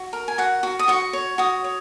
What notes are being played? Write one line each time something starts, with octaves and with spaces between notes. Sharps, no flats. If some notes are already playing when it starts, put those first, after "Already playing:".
Already playing: F#4
A#4
G#5
F#4 F#5
F#4
D#6
F#4 C#6
C#5
F#4 D#6
C#5